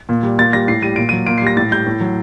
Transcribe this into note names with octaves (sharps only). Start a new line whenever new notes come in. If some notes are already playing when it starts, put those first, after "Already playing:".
A#2
G3
A#2 A6
G3 A#6
A2 C7
G3 D#7
A#2 D7
F#3 D#7
A#2 D7
C7
G3 A#6
A2 A6
G3 G6
A2
F#3